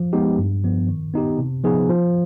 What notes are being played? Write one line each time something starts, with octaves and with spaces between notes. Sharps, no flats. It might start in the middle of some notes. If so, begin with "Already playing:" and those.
Already playing: F3
G#3 B3 D#4 G4
G2
F3 B3
D#3
B3 D#4 G4
C3
F3 B3 D#4 G#4
F3